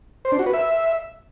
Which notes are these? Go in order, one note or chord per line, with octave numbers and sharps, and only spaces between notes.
C5
D4
F#4
B4
E5